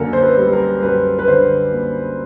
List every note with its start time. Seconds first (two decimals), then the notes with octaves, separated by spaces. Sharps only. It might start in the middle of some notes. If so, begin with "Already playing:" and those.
Already playing: F#2 D3 A#3 A4 A#4
0.13 C5
0.23 B4
0.38 G3
0.53 A#4
0.83 F#2 B4
1.19 B4
1.28 D3 C5
1.73 A#3